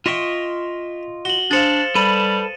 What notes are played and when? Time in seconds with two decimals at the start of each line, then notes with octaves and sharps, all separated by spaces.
0.06 F4 D#5 E5 G5 C#6
1.25 F#4 F#7 G7
1.51 D4 G#4 C5 F5 A6 C#7 E7
1.95 G3 A4 B4 B5 D#7